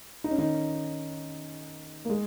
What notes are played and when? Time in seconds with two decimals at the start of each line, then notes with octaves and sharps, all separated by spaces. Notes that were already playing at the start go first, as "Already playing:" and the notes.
0.24 D#4
0.31 C#4
0.38 D#3 D#4
2.05 A#3
2.10 G#3